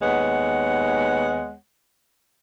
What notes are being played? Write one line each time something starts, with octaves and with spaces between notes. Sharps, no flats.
D#2 G#3 B3 C#5 F#5